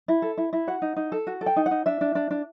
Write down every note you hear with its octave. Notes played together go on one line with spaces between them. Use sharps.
E4
A4
E4
E4
F#4 F#5
D#4
D#4
A4
F#4
A4
G5
D#4
F#5
D#4
D4 E5
D4
D4
D4